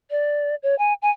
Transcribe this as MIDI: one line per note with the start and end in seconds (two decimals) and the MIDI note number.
0.11 0.55 74
0.63 0.75 73
0.79 0.93 80
1.02 1.10 80